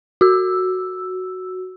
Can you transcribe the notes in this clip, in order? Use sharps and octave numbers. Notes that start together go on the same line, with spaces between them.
F#4 E6